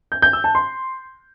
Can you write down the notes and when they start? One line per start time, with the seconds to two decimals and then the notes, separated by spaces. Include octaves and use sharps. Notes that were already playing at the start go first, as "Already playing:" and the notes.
0.12 G6
0.22 G6
0.33 E6
0.44 A5
0.55 C6